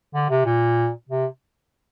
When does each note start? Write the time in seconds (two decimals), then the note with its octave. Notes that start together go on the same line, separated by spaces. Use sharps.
0.14 D3
0.30 C3
0.45 A#2
1.09 C3